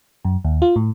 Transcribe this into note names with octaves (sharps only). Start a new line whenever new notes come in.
F#2
D#2
F4
A2